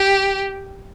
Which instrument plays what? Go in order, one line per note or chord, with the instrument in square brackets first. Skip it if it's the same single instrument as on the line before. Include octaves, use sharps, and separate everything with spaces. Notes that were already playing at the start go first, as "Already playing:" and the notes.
Already playing: [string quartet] G4